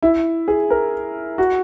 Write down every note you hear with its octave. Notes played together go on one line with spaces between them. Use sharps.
E4
G#4
A#4
F#4